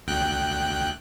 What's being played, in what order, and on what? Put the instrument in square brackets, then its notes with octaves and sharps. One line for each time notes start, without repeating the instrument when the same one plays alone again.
[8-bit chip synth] D2 G5 F#6